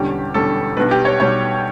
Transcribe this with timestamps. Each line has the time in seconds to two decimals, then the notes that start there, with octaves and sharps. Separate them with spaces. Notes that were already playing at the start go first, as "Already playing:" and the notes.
Already playing: E1 E2 D3 G3 C#4 G4
0.34 E1 E2 D3 G3 C#4 A4
0.77 B1 B2 G3 D4 B4
0.91 G4
1.05 C#5
1.20 B1 B2 G3 D4 C#5